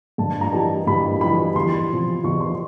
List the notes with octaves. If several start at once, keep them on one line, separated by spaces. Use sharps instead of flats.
G2 A5
A#5
E3 G3 A5
G2 B5
E3 G3 B5
E2 C6
C3 F3
E2 C#6
C6